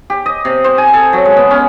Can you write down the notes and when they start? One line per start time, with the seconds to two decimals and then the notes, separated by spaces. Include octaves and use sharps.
0.10 G4
0.26 D#5
0.45 C3
0.64 C5
0.78 G#5
0.93 A4
1.13 F#3
1.25 G#3
1.37 B3
1.51 C#4